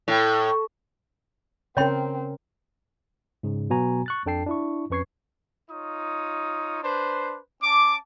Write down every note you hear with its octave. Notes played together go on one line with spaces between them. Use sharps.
A2
C#3 C4 C#4 A#4 C#5 G5 C6
G#2 C#3
B2 F#3 B3 F#4 G#5 A#5
C#6 F#6 A6
F2 D4 A4 G5 A5 C7
D4 E4 C#6
F2 C#4 B4 C#6 G#6 C7
D#4 F4 C#5 D#6
D4 B4 C5
C#4 A5 D6